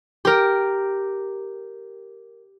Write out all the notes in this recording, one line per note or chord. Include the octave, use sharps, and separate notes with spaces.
G4 A#4